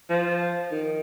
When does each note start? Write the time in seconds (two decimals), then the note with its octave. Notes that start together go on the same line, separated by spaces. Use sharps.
0.09 F3
0.71 D#3